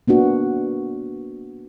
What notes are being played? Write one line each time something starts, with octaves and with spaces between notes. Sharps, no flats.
A#3 B3 D4 F#4